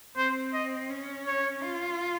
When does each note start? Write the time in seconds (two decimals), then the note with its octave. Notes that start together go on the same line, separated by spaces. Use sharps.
0.17 C4 C5
0.53 D#5
0.90 C#4
1.26 C#5
1.63 F4